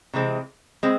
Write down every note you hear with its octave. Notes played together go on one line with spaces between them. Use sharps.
C3 E3 G#3 C4
G#3 C4